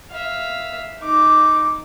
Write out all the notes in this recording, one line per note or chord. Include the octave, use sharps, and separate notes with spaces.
E5 F5
D#4 D6